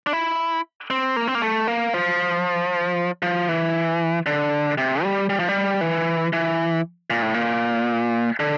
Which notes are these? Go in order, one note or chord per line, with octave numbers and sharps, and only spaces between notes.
D4
E4
C4
A#3
C4
A#3
A3
A#3
F3
F3
E3
D3
C3
G3
G3
F3
G3
E3
E3
A#2
A2
A#2
D3